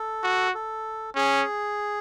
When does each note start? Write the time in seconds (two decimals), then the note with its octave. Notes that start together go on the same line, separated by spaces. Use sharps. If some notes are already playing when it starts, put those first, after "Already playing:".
Already playing: A4
0.23 F#4
0.55 A4
1.16 C#4 G#4